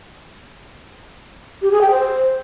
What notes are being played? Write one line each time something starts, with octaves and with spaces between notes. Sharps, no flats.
G4
G#4
G5
C5